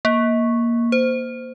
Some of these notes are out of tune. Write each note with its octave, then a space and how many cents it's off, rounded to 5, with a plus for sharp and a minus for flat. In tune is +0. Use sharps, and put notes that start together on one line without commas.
A#3 +10
C5 -20